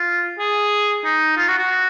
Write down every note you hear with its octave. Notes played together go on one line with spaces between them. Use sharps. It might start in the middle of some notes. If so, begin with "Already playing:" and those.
Already playing: F4
G#4
D#4
F4
F#4
F#4